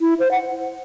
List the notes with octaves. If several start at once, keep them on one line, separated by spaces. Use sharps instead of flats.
E4
C5
F#5